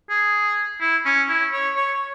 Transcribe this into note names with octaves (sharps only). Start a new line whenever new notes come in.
G#4
E4
C#4
E4
C#5
C#5